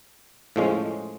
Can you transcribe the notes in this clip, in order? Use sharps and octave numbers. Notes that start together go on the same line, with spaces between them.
A2 F3 G#3 C#4